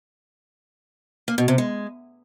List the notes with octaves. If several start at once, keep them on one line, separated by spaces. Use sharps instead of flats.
A#3
B2
C3
G#3